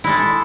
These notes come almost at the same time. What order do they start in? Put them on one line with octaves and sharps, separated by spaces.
E4 G#3 A4